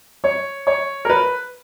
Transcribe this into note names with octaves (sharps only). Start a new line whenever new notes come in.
C#5
C#5
A#4
B4